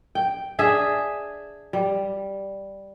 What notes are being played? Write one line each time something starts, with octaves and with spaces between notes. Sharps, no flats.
G5
D4 G#4 E5
G3